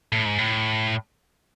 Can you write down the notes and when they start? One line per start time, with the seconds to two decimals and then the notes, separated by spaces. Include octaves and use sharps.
0.12 A2
0.25 G#2
0.38 A2